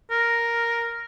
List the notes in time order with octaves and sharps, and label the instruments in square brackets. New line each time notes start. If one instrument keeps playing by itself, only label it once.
[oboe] A#4